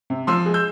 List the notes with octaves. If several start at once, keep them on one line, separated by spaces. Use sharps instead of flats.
C3
F3 C6 E6
G#3
E6 G6